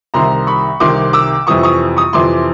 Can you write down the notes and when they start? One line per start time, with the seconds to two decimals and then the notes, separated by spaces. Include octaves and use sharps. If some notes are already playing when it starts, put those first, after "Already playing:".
0.14 C2 C3 D#3 A#5 C6
0.47 B5 C#6
0.80 C2 C3 D#3 C6 D6
1.13 D6 E6
1.47 F2 C3 E3 C#6 D#6
1.63 C#6 D#6
1.97 C#6 D#6
2.13 F2 C3 E3 C6 D6